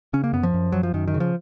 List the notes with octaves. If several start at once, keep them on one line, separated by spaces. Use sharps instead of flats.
C#3 C#4
A#3
F#2 B3
F3
F#2
F#2 F#3
F3
F#2 D#3
D#3
C#3
F3